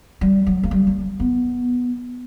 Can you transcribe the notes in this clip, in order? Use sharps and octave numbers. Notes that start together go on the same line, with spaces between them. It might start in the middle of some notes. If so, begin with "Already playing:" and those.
G3
F#3
A#3
G3
A#3
B3